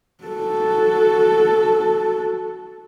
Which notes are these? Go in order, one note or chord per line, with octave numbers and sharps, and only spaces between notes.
F#4 A4